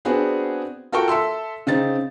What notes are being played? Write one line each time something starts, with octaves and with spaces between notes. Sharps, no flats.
B3 C4 D4 F#4 G#4
F4 F#4 A4 A#4 G5 C#6
A4 E5 C6 E6
C#3 C4 D#4 A6